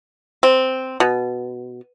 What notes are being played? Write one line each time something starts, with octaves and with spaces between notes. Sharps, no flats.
C4
B2